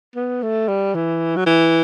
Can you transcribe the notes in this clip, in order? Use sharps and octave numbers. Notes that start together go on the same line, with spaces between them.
B3
A3
G3
E3
F#3
E3